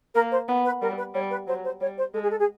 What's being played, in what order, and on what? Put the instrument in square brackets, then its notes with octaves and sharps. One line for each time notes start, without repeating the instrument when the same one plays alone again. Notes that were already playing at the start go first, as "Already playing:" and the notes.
[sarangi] A#3 [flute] A#4
[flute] C5
[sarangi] B3
[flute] B4
[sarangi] G3 [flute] A#4
[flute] B4
[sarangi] G3 [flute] C#5
[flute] B4
[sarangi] F#3 [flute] C5
[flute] C5
[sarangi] G3 [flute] C#5
[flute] C5
[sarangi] G#3 [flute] A4
[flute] G#4
A4
G#4